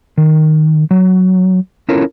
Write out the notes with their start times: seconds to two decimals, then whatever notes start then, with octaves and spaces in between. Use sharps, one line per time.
0.18 D#3
0.91 F#3
1.89 C#4 E4 F4 A4 A#4 C#5